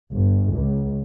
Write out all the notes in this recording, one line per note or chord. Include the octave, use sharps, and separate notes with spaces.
G1
C#2